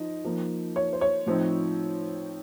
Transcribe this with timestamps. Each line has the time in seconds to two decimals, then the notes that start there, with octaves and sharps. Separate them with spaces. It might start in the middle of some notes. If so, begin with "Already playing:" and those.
Already playing: F3 D#4 D#5
0.25 F3 A#3 D#4
0.76 C#5
0.93 C5
1.01 C#5
1.26 A2 F3 C4 D#4